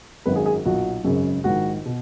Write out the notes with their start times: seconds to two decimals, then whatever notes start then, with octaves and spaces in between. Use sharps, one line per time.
0.26 G#1 F#2 D#3 F#3 B4
0.36 G#4
0.46 G#4
0.65 B1 A#2 F#3 F#4
1.04 G#1 F#2 C#3 G#3
1.44 A#1 G#2 D#3 F#4
1.85 B2